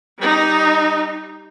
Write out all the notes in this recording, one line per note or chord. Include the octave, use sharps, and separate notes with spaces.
G3 D#4